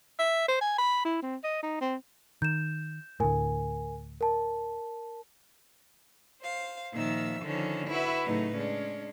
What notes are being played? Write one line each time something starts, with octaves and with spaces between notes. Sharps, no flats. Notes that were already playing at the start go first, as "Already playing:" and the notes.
E5
C5
G#5
B5
E4
C4
D#5
D#4
C4
D#3 G6 E7
D2 A2 A#4 G#5
A#4 A5
C5 F5
A#2 D#3 F3 E5 E6
D3 D#3 F3 C#4
E4 F#4 B4 E5
A2 C#3 F#3 A3 D#4 B4
G#3 C#4 D4